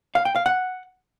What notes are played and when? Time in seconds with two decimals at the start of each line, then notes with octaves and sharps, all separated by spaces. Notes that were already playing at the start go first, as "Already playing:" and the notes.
0.15 F5
0.25 G5
0.36 F5
0.46 F#5